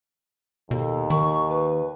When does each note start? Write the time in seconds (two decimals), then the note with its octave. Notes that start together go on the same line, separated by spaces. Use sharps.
0.71 D#2 B2 A4
1.10 D#3 C#6
1.49 B4